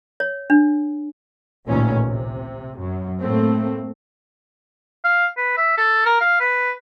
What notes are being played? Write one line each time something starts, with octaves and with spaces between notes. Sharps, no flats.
C#5
D4
A1 D2 A#2 D#3 E3 C#4
C3
F#2
A2 A3 A#3 C4
F5
B4
E5
A4
A#4
F5
B4